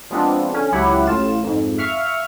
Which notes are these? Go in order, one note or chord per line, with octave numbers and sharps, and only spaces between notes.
F3 G#3 B3 C4 D4 F4
D3 C#4
C#2 F#3 E4 G4 F#5
A1 A2 F4 E7
F2 G#2
E5 F5 C#6 F6